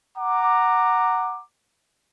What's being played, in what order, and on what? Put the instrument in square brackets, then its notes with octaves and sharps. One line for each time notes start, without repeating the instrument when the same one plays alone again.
[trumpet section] F#5 A#5 D6